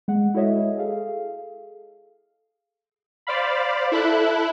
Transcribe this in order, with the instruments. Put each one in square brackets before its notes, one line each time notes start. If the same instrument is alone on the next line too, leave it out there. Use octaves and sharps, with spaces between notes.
[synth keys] G#3 F#5
E4 F#4 A4 C#5 D#5 E5
G#4 A4 F5
[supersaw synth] C5 D5 F5 B5
E4 A4 B5 F#6